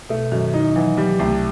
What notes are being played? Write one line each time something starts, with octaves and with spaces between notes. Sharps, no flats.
B2 A3
F#2 D#3
D#4
E3 F#3
F#3 G3
C2 A3